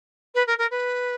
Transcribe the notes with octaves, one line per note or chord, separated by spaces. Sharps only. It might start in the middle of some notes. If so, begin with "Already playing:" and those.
B4
A#4
A#4
B4